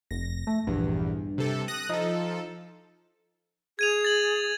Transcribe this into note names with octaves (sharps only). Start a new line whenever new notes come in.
F1 A#6
A3
A#1 E2 G2
C3 A4
D#6 F#6 A#6
F3 D#4 A4
G#4 G#6 D#7 F7
A6 F#7